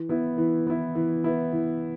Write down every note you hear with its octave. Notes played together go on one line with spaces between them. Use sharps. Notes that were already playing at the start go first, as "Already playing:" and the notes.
Already playing: E3
B3 E4
E3
B3 E4
E3
B3 E4
E3